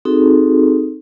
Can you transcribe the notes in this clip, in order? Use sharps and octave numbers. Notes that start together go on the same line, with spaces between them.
C4 D#4 F#4 G#4 A4